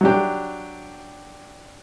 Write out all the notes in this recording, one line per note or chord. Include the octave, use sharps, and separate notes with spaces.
F#3 D4 G4